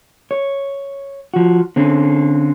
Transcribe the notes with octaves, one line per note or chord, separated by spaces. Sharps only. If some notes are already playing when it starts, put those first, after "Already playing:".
C#5
F3 F#4
D3 C4 C#4